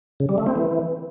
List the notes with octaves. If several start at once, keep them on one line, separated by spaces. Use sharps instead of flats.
C#3
G3
A3
C4
E3